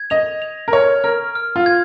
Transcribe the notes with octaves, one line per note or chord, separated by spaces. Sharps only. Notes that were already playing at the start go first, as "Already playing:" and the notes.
Already playing: G#6
D#5 F7
F7
A#4
C#5 F6
A#4 F6
F6
F4
G#6